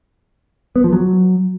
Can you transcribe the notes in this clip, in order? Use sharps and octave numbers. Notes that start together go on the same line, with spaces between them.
B3
F3
F#3